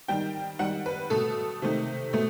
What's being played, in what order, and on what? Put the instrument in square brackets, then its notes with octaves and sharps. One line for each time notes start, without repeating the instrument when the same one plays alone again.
[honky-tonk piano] D#3 G3 G5
D#3 G3 F#5
B4
B2 A3 A4
C3 D#3 A3
B2 A3